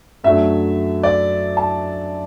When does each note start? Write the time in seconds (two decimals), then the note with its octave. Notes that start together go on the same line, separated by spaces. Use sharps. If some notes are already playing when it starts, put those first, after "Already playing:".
0.24 F#2 F#3 A3 D4 E5
1.03 D5
1.57 A5